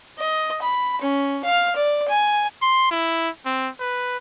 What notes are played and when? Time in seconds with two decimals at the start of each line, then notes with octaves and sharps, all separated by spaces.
0.18 D#5
0.62 B5
1.02 C#4
1.44 F5 F6
1.76 D5
2.08 G#5
2.62 C6
2.91 E4
3.45 C4
3.80 B4